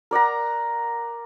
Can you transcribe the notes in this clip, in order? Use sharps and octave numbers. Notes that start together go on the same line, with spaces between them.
A#4 D5 F#5 A#5